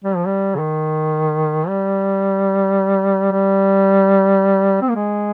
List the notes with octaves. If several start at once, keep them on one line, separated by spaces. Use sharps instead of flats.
G3
F3
G3
C#3
D#3
G3
G3
C4
A#3
G#3